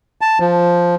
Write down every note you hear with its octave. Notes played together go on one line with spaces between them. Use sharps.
A5
F3